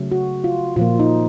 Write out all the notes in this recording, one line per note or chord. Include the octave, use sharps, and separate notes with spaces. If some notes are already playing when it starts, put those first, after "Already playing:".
Already playing: C#3 F#3 A3
F#4
F4
A#2 F3 A#3 F4
D#4